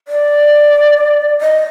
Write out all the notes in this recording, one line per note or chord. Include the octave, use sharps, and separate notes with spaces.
D5
D#5